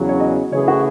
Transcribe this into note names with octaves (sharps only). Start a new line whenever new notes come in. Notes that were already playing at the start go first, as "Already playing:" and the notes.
Already playing: E2 C#3 F#3
C#5
D#5
C#3 E3 A3 E4 G#4 C#5
F#4